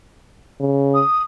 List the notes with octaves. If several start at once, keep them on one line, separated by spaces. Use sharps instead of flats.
C#3
D#6